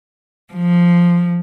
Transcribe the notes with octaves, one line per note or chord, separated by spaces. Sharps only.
F3